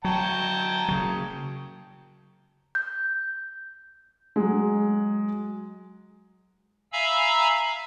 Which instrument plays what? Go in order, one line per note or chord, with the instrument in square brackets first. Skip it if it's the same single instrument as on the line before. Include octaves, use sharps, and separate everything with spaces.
[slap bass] F#3 [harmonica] G5 A5 A#5
[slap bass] C#3 F#3
[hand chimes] G6
[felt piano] F#3 G#3
[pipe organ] E5 F5 G#5 A#5 B5 E6